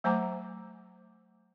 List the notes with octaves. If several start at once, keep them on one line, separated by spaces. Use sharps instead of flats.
F#3 A3 C5 G#5 A#5 D6